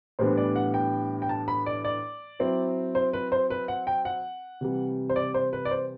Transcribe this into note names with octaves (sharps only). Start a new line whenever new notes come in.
A2 E3 G3 B3 D4 C5
D5
F#5
G5
G5
A5
B5
D5
D5
F#3 C4 E4
C5
B4
C5
B4
F#5
G5
F#5
C3 E3 G3
C5
D5
C5
B4
D5
C5